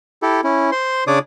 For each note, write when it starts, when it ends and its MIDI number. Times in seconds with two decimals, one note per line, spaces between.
0.22 0.41 64
0.22 0.41 67
0.22 0.41 69
0.44 0.70 61
0.44 0.70 64
0.72 1.04 72
0.72 1.04 84
1.07 1.19 49
1.07 1.19 62
1.07 1.19 73
1.07 1.19 74
1.07 1.19 86
1.07 1.19 87